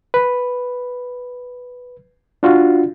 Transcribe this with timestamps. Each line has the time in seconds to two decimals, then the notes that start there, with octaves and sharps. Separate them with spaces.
0.14 B4
2.43 D4 F4 F#4